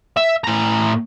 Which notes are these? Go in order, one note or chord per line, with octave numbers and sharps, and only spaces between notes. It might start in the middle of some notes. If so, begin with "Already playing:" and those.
E5
A2 A#5